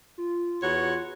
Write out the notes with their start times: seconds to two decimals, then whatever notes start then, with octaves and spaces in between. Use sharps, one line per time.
0.18 F4
0.62 E2 F#4 C#5